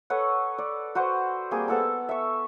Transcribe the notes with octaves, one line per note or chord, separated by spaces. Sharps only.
A4 B4 C#5 F#5
D5
F#4 B4 C5 F#5
G3 A#3 C4 G#4
B3 A4 F#5 A5
E5 C#6